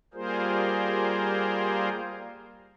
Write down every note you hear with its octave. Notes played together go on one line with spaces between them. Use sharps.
G3 A#3 F4 G#4 A#4 C5